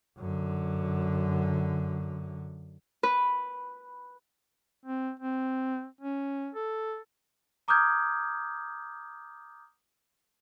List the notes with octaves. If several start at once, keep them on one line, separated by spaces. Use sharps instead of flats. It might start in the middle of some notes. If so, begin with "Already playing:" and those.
F#2 D3
B4
C4
C4
C#4
A4
A#5 D6 D#6 F6 G6 G#6